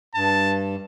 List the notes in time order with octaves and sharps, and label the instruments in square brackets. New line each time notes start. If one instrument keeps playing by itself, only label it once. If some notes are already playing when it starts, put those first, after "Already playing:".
[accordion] G2 [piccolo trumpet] A5